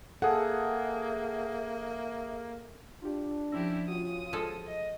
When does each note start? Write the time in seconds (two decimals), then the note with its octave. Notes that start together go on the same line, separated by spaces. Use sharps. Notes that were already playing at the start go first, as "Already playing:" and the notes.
0.22 A#3 G#4 A4 E5 F#5
3.02 D4 F4 G4
3.52 F3 C#4 E4 G4 E6 A#6
3.88 C#4 F4 F#4 D#6
4.33 F3 G#3 A4
4.66 D#5